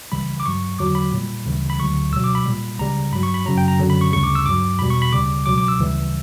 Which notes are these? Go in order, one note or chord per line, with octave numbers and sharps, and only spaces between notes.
C#2 C#3 E3 G3 B5
D6
G2 F#3 C#6
E2 D3 F#3 D6
B5
A#2 G3
D2 C#3 E3 G3
B5
D2 D3 F#3 C#6
C#2 B2 F#3 E6
D6
B5
A#2 G3
C#2 C#3 G3 A#5
G2 F#3 B5
C#6
B5
F#2 C#3 F#3 A#5
G5
A#5
F#2 D3 F#3
B5
C#6
D2 C#3 G3 C#6
D6
E6
G2 F#3 D6
E2 B2 G3 B5
C#6
B5
D2 C#3 G3 D6
C#2 B2 F#3 D6
D6
E6
D2 C#3 E3 G3